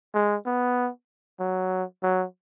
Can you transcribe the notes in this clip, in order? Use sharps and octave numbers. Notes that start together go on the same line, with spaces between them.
G#3
B3
F#3
F#3